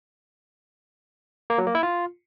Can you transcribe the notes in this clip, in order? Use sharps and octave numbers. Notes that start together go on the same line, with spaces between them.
A#3
F#3
A#3
E4
F4